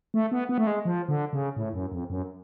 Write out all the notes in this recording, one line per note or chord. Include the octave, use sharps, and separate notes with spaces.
A3
B3
B3
A3
G#3
F3
D3
C#3
A2
F#2
F2
F#2